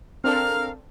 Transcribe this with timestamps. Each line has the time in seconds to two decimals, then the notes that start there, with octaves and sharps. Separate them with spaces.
0.24 C4 D4 A4 A#4 F5 F6